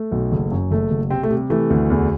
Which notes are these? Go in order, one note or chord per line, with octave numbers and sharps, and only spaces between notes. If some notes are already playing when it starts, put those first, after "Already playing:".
Already playing: A3
B1
F#1
F#2
F#1 A3
F#1
C3 C4
A3
C3
G3
E3 A3
D2
E2